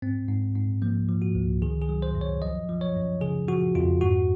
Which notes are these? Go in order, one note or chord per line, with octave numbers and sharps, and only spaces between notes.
G#2 C4
G#2
G#2
F3 A#3
F3
F#4
C#2
D#3 G#4
G#4
F#3
C5
F#2
C#5
F3 D#5
F3
C#5
F#2
C#3 G#4
F3 F#4
F2 F4
G#2 F#4